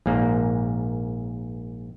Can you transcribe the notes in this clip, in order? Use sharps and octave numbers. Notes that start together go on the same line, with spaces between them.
A#1 G#2 A#3